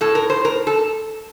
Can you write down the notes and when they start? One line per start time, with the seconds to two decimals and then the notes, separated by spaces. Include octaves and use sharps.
0.01 A2 A4
0.15 A#4
0.30 C5
0.45 A#4
0.67 A4